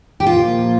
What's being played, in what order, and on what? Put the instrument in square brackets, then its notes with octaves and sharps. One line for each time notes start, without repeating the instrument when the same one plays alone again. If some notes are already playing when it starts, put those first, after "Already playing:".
[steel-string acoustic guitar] G4
[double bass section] A#2 F3 A#3 [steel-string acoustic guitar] F4